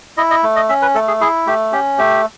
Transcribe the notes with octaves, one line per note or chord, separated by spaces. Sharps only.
E4 D#5
D#5
A3
D#5
C#4 E5
B4
A3 A4
G#4
E4 G#4
A3 G4
C#4 G4
A3 G4